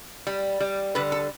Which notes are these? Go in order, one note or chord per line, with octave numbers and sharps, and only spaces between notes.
G3
G3
D3 B4
A4